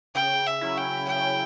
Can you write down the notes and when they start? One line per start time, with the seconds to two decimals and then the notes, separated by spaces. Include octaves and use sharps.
0.15 C#3 G5
0.46 E5
0.61 F#3 C#4 E4
0.78 G5
1.08 C#3 G5